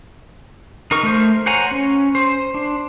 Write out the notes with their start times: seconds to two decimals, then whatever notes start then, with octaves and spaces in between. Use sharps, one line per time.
0.91 D#4 A#4 C#6
1.03 A3 A#4 C5
1.46 C5 C#5 F#5 G#5 A#5
1.71 C#4
2.15 C5
2.54 D4